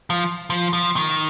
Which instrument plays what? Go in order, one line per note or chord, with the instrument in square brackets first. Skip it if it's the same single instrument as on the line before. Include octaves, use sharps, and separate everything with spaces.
[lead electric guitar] F3
F3
F3
D#3